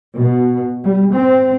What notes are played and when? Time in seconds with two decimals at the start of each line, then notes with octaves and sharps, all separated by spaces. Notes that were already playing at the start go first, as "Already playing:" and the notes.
0.17 B2
0.85 G3
1.16 C4